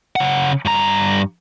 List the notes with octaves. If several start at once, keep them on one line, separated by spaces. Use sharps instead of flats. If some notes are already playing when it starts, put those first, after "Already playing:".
C#3 F#5
G2 A#5